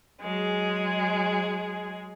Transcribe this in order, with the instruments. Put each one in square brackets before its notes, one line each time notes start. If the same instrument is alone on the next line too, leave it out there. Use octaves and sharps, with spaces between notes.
[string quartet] F#3 G#3 G#4